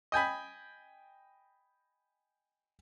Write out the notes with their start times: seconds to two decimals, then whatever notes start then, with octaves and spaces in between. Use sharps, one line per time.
0.12 D#5 G5 G#5 B5